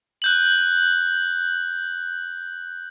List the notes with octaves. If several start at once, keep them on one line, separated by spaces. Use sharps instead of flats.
F#6 G6 F#7